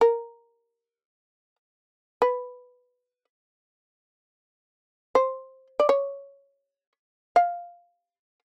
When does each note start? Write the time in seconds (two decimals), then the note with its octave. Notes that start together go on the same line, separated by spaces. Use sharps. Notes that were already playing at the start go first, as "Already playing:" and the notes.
0.01 A#4
2.22 B4
5.15 C5
5.80 D5
5.89 C#5
7.36 F5